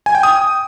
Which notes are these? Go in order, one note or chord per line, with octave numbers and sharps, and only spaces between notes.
G#5
G5
D#6